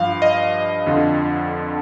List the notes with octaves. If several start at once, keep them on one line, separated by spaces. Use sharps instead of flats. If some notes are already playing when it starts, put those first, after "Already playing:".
Already playing: G2 F3 F5
D#5
F2 D3 F3